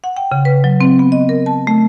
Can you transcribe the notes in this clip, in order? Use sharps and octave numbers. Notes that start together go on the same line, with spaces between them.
F#5
G5
C#3
B4
F#3
C4
B3
D#5
A#4
A5
A3